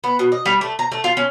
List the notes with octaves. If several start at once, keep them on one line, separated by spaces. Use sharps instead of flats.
B3
B2
D#5
G3
A3
A#5
A3
F4
C#4